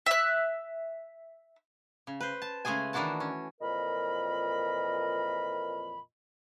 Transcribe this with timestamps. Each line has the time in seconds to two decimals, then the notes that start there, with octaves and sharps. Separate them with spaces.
0.06 E5 F#6
2.07 C#3
2.20 B4 C5
2.42 A5
2.65 C#3 G#3 A3 G#4 G#5
2.93 D#3 E3 D4 E4 F#4 A5
3.20 C#4
3.61 F2 A#2 E3 A#4 D#5 B5